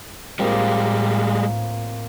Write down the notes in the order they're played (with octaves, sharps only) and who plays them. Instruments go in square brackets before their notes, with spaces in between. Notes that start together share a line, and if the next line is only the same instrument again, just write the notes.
[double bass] A2 [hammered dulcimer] F3 A#3 C4 [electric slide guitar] G3 G#3